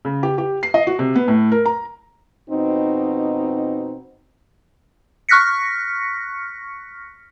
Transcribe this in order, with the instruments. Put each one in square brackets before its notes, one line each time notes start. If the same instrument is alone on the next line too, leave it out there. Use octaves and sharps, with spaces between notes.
[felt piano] C#3
G4
G4
C7
D#5
F#4
C3
B3
A2
A#4
A#5
[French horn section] F2 B2 C4 D#4
[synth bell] C#6 F6 F#6 A#6 B6 C#7